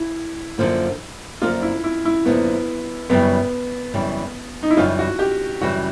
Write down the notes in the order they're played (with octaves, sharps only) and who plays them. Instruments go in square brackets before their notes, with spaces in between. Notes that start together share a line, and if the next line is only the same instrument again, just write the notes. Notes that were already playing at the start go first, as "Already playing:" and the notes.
Already playing: [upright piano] E4
[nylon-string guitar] F#2 D3 F3 A#3
[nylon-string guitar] F#2 D3 F3 A#3 [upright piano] F4
[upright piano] E4
E4
E4
[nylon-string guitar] F#2 D3 F3 A#3 [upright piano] B3
[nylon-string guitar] F#2 C#3 E3 G3 [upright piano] B3
[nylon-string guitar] F#2 C#3 E3 G3
[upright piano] D#4
E4
[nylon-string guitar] F#2 C#3 E3 G3 [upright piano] F4
[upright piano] F#4
G4
[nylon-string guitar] F#2 C#3 E3 G3 [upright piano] F#4